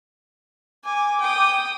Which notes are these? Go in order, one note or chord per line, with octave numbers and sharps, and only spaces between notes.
G#5 D6
G5 D#6